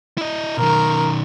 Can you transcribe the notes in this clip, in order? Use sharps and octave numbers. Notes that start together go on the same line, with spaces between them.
E4 D#5
B1 D#3 A#4